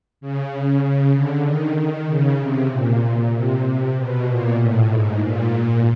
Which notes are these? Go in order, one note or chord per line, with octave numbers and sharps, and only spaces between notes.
C#3
C#3
D3
D#3
D#3
C#3
C3
A#2
C3
C3
B2
A#2
A2
G#2
A#2